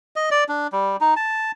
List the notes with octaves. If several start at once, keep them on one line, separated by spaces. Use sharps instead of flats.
D#5
D5
D4
G3
D#4
A5